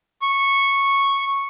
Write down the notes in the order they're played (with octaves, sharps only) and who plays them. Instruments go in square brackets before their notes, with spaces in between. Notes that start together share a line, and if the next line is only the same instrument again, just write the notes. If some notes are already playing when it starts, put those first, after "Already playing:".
[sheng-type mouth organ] C#6